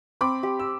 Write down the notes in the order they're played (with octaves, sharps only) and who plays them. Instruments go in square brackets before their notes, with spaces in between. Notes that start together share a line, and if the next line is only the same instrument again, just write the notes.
[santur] C4 [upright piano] B5 D6
[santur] G4
[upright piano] E6